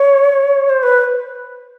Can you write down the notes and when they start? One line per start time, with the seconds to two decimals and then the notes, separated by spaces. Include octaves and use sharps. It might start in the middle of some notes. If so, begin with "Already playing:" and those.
Already playing: C#5
0.69 C5
0.83 B4